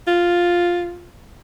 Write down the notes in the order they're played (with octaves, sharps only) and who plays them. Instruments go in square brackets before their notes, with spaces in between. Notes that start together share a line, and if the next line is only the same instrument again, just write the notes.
[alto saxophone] F4